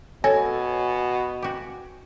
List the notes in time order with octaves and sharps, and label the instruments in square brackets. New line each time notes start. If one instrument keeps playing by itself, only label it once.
[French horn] B2 [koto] A4 [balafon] C#5 [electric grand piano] G#5
[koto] F#4 G4